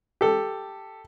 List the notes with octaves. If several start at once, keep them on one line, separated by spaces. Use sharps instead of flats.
G4 A4